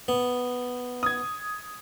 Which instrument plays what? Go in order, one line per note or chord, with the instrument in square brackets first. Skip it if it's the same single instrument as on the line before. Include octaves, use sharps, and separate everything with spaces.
[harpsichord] B3
[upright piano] D#6 G#6